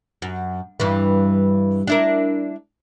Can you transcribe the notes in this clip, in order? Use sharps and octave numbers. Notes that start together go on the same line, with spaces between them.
F#2
G2 E3
D4 E4 A#4